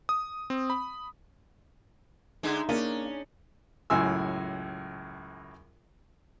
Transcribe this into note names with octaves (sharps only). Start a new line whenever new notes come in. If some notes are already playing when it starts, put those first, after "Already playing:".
D#6
C4
B5
D3 G#3 D#4 E5
A#3 C#4 D4 D#5
C#2 F#2 A2 G#5 C6 E6